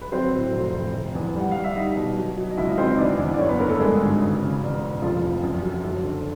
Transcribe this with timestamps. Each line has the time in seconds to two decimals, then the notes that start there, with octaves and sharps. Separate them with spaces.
0.01 B4
0.12 F#3 C4 C5
0.33 A2
0.53 F1
0.74 F1
0.94 F1
1.15 E2
1.35 G3 F#5
1.51 G3 F5
1.64 E5
1.76 G3 D#4 D#5
1.96 B2
2.16 F#3
2.37 F#3
2.51 D#5
2.57 C#2 E4 E5
2.68 D#4 D#5
2.77 C#2 C4 C5
2.87 D#4 D#5
2.98 E2 D4 D5
3.18 E2
3.34 D5
3.39 F#1 C#4 C#5
3.49 B3 B4
3.59 D3 A#3 A#4
3.69 A3 A4
3.79 G2 G#3 G#4
4.00 G#1
4.20 C#3
4.41 C#3
4.61 E1
4.82 E1
5.02 F1 F3 F4
5.22 F1
5.43 F#2
5.63 F#3
5.84 F#1
6.04 D3